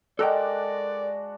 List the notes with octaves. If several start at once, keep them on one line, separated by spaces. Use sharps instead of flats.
G#3 D4 F#4 A4 A#4 D5 G5